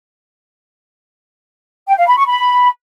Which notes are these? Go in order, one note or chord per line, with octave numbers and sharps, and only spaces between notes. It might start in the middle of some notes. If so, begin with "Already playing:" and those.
G5
F5
B5
C#6
B5